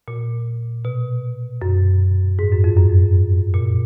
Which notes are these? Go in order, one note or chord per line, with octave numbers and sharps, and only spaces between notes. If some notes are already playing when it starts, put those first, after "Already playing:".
A#2
B2
F#2
G#2
F#2
F2
F#2
A#2